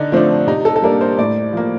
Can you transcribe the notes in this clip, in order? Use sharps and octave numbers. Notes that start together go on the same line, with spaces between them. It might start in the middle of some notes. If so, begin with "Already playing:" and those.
Already playing: D3 D4 D#4
F3 A3 C4 D4
C3 D#4
A4
A4
G3 A#3 D4 A#4
C5
A2 D5
F3 A#3